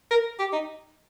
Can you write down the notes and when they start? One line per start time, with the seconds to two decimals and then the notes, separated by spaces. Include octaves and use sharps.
0.11 A#4
0.39 G4
0.52 D#4